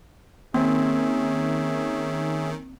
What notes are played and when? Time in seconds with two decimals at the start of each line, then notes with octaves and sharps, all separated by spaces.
0.54 D#3 A#3 C4 C#4 G#4 E5